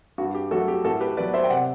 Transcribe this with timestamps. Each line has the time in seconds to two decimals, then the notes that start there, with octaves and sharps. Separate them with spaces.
0.18 G2 F#4
0.35 G4
0.51 F#3 A3 D4 F#4 A4
0.68 G4
0.84 A2 F#4 A4
1.01 G4 B4
1.17 F#3 B3 B4 D5
1.34 C5 E5
1.44 G5
1.50 C3 D5 F#5